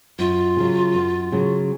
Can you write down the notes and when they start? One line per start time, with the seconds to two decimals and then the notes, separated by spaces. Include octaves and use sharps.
0.19 F#2 F4
0.57 C#3 F#3
0.95 F#2
1.32 C#3 F#3